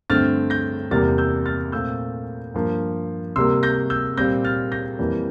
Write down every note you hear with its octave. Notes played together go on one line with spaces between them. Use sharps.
G2 D3 A3 C4 F6 A6
G6 A#6
E2 C3 G3 A#3 F6 A6
E6 G6
F6 A6
A#2 A3 C4 E6 G6
G2 F3 A#3
C3 G3 A#3 C6 E6
G6 A#6
E6 G6
A#2 G3 C4 G6 A#6
F6 A6
G6 A#6
F2 E3 G3 A#3